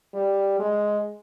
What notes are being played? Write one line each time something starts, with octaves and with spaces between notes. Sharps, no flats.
G3
G#3